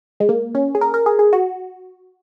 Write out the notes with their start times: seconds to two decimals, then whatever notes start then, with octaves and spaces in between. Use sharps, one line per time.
0.20 G#3
0.29 A#3
0.55 C#4
0.75 G#4
0.81 A#4
0.94 A#4
1.06 G#4
1.19 G#4
1.33 F#4